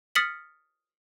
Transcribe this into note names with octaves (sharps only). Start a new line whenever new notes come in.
D#6 F6 A6 B6 C#7 F#7